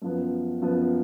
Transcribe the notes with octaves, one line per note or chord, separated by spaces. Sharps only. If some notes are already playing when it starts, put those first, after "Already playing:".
F#2 F3 B3
F#2 F3 B3